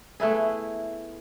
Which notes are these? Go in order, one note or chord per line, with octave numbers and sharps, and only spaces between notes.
A3 B3 E4 G#4